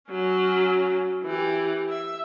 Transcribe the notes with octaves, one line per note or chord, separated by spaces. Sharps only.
F#3 C#4
E3 G4
E5